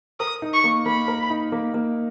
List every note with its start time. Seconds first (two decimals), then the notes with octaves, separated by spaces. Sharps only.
0.20 A#4 D#6
0.42 D#4
0.53 C#6
0.64 A#3
0.86 A#3 B5
1.08 A#4
1.30 D#4
1.52 A#3
1.74 A#3